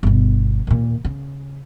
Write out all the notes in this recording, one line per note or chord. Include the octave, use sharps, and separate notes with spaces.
G1 B2
D#2 A#2
C#3